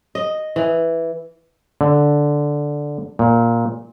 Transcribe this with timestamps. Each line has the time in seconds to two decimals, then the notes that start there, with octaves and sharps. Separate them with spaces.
0.15 D#5
0.56 E3
1.81 D3
3.19 A#2